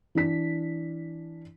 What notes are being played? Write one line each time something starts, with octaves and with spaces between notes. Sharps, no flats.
E3 D4 B6